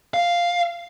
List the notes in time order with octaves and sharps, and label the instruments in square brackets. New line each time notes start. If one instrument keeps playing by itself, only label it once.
[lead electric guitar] F5